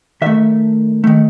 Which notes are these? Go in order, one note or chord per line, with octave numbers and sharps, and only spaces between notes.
D#3 A3 E5
D#3 A3